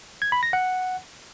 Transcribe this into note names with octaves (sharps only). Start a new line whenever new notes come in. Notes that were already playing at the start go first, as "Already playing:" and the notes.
G#6
B5
A#6
F#5